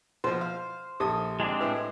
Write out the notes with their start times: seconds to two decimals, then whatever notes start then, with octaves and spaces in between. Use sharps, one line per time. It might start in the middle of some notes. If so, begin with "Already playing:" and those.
0.24 B2 F3 C5
0.41 F5
1.00 A#1 D#4 G4 A4 D#6
1.40 G#3 C4 D4 E4
1.61 A2 E4 B4